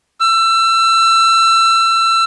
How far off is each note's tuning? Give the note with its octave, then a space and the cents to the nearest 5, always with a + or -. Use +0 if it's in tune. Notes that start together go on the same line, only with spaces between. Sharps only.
E6 +30